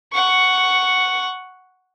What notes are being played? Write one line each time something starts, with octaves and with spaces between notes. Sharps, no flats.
F#5 C#6